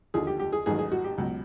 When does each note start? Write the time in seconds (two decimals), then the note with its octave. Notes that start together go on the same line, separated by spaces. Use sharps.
0.14 D#2 D3 F3 G#4
0.27 G4
0.39 G4
0.53 G#4
0.66 A1 G#2 D#3 F#3 G#4
0.79 G#4
0.92 F#4
1.04 G4
1.18 C#2 B2 F#3